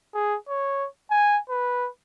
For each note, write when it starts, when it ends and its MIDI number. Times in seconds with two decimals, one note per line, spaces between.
0.14 0.36 68
0.49 0.87 73
1.11 1.39 80
1.50 1.89 71